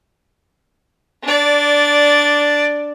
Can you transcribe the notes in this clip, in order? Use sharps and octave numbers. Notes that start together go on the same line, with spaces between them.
D4 D5